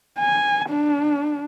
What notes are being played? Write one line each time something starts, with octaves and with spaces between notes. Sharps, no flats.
G#5
D4